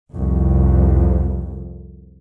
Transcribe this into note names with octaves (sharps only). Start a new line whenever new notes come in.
C2 F2